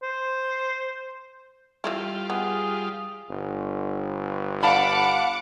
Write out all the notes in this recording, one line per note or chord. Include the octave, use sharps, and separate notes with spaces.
C5
E3 G3 A3 E4 F4
B3 G#4
G1
F5 F#5 A5 B5 D6 C#7